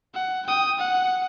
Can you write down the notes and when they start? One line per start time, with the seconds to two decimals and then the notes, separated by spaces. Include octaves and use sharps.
0.14 F#5
0.46 G5 D#6
0.78 F#5